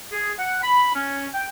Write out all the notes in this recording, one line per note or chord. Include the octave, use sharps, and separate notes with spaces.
G#4
F#5
B5
C#4
G5